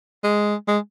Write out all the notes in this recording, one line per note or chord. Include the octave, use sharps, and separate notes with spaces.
G#3
G#3